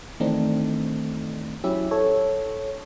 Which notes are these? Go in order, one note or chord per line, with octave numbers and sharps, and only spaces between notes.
D#3 E3 A3 C4 D4 D#4
F#3 C#4 E4 G4 E5
A4 C#5